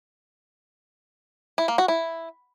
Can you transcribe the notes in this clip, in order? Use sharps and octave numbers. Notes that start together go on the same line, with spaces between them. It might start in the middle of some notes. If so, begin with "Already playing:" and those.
E4
A#3
F#4
E4